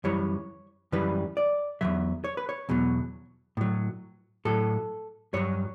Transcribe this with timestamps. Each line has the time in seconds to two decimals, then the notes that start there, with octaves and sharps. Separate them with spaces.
0.04 F#2 E3 G3 C#5
0.92 F#2 E3 G3 B4
1.37 D5
1.81 E2 B2 F#3 E5
2.24 C#5
2.37 B4
2.49 C#5
2.69 E2 B2 F#3
3.57 A2 F#3
4.45 A2 F#3 A4
5.33 G2 F#3 C#5